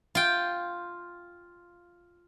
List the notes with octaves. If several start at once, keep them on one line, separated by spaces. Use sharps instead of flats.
F4 G5